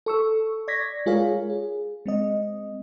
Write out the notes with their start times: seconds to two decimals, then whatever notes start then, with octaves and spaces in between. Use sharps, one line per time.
0.06 A4 C#6 E6
0.68 D5 C#6 G#6 A#6 B6
1.06 G#3 F4 G#4 A#4 C#5 F5
1.50 G#4
2.06 G#3 C4 D#5